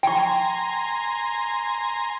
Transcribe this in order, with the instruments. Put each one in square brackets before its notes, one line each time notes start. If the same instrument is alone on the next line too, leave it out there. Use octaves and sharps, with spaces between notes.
[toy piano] G5 C#6 [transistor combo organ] G#5 A#5 C6